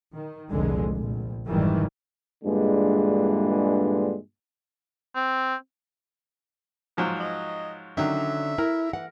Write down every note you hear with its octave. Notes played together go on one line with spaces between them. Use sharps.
D#3
F1 C2 A#2 D3 G#3
A#1
F1 G#2 D#3 E3 G3
G2 A#2 D3 E3 G#3
C4
G#2 F3 F#3
D#5
D3 D#3 F#3 C#4 D4 E5
E4 A#4
E3 F#5